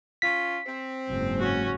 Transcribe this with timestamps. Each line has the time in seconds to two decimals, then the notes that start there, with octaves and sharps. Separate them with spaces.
0.22 C#4 F4 B6
0.67 C4
1.08 F#1 G#2
1.39 C#4 F#4